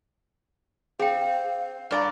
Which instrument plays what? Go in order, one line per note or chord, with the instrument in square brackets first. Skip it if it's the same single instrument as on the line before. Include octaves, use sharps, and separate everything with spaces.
[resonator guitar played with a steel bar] C4 [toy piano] G#4 G5 [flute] F5
[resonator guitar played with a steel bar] G2 D5 A#5